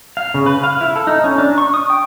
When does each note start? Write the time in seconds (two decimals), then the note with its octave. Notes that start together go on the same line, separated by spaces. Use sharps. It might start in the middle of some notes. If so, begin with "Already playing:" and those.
0.17 F5
0.34 C#3
0.46 B4
0.64 F5
0.81 E4
0.96 A4
1.07 D#4
1.24 C#4
1.38 D4
1.58 C#6
1.74 D#6
1.90 G5